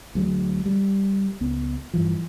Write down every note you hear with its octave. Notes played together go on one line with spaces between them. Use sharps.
D2 F#3 G#3
G3
C#2 B3
G2 E3 F3